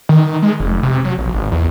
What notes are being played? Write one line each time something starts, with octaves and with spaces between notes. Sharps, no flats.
D#3
G#3
F1
C3
F#3
A#1
G#1
E2